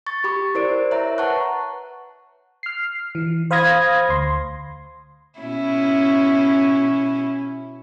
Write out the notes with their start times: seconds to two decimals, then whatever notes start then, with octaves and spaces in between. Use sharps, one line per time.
0.06 C#6 A6
0.24 G4 B5 D6
0.55 E4 A#4 C5 D5 D7
0.91 C#5 E5 A#5
1.18 B4 F#5 A5 A#5 C#6 F#6
2.63 F6 C7
3.15 E3
3.51 C5 F5 B5 D#6 G#6 A#6
4.09 D2 C6
5.39 B2 C#4 E4